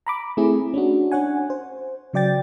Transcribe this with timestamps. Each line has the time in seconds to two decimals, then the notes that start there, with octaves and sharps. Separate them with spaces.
0.07 A#5 B5 D6
0.37 A3 C4 E4 G#4
0.74 C#4 D4 F#4
1.12 D4 C#5 F#5 G#5
1.50 C5
2.13 C#3 F#3 D5 G5 A6